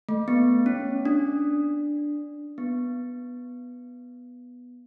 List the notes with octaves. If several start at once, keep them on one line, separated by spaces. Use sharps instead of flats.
A3
B3
C#4
D4
B3